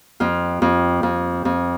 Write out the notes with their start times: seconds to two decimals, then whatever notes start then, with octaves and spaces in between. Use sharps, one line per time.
0.20 F2 F4
0.62 F2
1.03 F2
1.45 F2